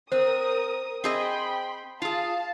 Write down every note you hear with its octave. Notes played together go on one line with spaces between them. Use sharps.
C4 A#4 C5 D#6
C4 G#4 D#5 G5 B5 C6
F4 G#4 F5 A5